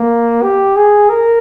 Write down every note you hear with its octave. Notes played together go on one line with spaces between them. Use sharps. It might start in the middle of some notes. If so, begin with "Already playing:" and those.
Already playing: A#3
G4
G#4
A#4